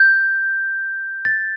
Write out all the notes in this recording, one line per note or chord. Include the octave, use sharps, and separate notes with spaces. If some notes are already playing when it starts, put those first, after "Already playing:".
Already playing: G6
A6